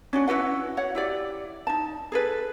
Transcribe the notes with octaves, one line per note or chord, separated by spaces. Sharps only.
C#4 D4 F#4
E4 F#4 B4 F#5
C#5 F#5
E4 G4 D5
D#4 A5
G#4 A4 B4